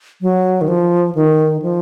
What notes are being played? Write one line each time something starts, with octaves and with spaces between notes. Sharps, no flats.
F#3
D#3
F3
D#3
F3